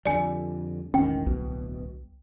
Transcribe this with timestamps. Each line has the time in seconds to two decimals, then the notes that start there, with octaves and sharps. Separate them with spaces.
0.06 F2 D3 G3 D5 G#5
0.94 E1 A1 D#3 C#4 G5
1.26 D1 C2 B2